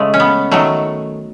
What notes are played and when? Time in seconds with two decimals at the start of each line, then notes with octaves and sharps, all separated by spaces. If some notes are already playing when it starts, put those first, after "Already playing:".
Already playing: C#3 G#3 A3
0.14 C#4
0.20 B3
0.51 D#3 F#3 A3